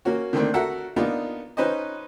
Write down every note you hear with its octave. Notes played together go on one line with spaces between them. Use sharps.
A#3 C#4 F#4
D3 D#3 A3 A#3 C4 D4
F#4 A4 A#4 E5 F#5
A#3 B3 D4 D#4 F4
C#4 D#4 B4 C5 D#5